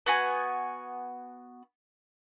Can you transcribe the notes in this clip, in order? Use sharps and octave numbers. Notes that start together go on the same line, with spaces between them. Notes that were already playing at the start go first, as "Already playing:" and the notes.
B3 F#4 G#5